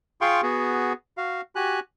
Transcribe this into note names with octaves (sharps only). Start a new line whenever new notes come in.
F4 G#4 F5 G5 C6 C#6
B3 F#4 G#4
F#4 F5
F#4 G4 G#5 F#6